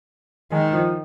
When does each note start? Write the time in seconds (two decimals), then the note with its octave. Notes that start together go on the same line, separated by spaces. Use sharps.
0.52 D#3 G#3
0.73 F3